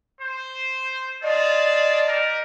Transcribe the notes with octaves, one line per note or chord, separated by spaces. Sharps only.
C5
F4 G#4 D5 D#5 A5
G3 A#4